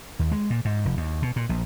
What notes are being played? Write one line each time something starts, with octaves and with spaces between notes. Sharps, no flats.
D#2
G#3
A#2
G#2
F1
D#2
B2
A#2
A#1